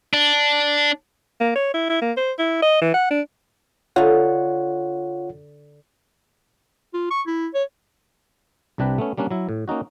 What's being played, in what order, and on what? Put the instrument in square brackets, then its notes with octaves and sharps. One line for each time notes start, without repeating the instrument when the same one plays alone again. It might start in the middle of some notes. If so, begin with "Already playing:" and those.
[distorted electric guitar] D4
[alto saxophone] A#3
C#5
E4
E4
A#3
C5
E4
D#5
E3
F#5
D4
[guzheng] D3 D#4 [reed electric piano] F4 C#5 F#5
[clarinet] F4
C#6
E4
C#5
[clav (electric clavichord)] C2 C3 D4 G4 B4 G5
A3 B3 C#4
G3 A#3 C#4 D4
F#3 E4
A2
A#3 C#4 D#4 F#4